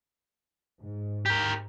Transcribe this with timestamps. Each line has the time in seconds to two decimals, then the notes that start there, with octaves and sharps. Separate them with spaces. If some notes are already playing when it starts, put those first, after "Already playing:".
0.81 G#2
1.26 G4 A#4